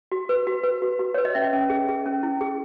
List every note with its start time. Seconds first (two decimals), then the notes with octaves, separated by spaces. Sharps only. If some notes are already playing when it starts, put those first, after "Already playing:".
0.12 F#4
0.29 B4
0.47 F#4
0.63 B4
0.82 F#4
0.99 F#4
1.14 B4 C#5
1.25 D#5
1.34 C#4 E5
1.53 C#4
1.70 G#4
1.89 G#4
2.06 C#4
2.23 E4
2.41 G#4